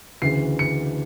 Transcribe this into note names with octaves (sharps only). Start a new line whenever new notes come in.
D2 C#3 E3 C7
C#7